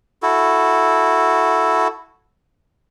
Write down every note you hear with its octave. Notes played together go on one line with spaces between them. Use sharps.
E4 F#4 A4